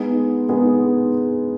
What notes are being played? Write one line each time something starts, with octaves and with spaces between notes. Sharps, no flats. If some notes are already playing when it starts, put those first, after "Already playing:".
Already playing: G#3 B3 D#4 G#4
G#3 B3 D#4 G#4